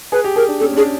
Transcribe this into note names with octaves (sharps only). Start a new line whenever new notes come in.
G#4 B4
G4
G#4 A#4
D4
C#4 A4
C#4
D4 G#4